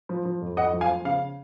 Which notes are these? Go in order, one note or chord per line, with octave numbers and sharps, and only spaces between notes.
F3
F3
F2
F2 D#5 F#5
F3
F5 G#5
F3
C#3 F5